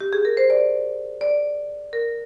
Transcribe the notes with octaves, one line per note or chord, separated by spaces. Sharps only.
G4
G#4
A#4
C5
D5
D5
A#4